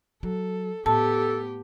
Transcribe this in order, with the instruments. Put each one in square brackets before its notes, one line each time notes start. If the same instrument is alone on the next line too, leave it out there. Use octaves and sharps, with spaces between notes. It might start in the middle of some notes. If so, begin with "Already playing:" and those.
[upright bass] F#3 [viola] A4
[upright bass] A2 [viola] B3 G4 [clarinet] A4 [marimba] A5